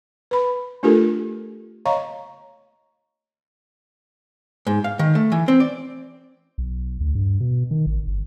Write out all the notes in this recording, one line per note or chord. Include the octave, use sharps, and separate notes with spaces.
B4 B5
A3 D4 F4 G4 A4 A#4
C#5 D#5 F5 A#5 C#6
G#2
F5
D#3
A3
E3
C4
D5
B1
D2
G2
B2
D#3
A1
G1